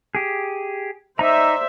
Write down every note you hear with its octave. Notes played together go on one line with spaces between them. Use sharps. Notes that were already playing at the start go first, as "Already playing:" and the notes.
G4 G#4
D#4 C5 D5 E5 A#5